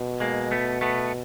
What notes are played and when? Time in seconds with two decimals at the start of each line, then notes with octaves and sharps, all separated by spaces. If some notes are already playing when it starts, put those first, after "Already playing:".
Already playing: B2
0.20 G#3 A#3
0.51 A3 B3
0.81 A3 B3